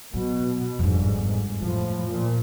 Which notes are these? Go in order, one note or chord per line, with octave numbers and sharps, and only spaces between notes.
B2 F#3
G1 F2 G#2 D4
F2 A2 F3
A#2